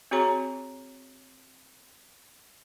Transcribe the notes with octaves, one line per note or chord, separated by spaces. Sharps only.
C4 F#4 G#4 C#5 A#5